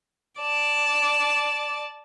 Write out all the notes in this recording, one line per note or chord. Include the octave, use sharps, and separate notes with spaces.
D5 A5 D6